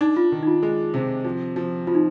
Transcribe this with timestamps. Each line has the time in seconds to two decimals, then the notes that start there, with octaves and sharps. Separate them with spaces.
0.01 D4 D#4
0.17 F4
0.32 D#3
0.43 D#4
0.47 F4
0.63 G#3
0.94 C3
1.24 F3
1.56 F3
1.87 F3 F4
1.95 D#4